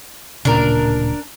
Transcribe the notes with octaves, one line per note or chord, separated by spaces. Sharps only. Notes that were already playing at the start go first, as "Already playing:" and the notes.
D1 A#2 C#3 D4 A#4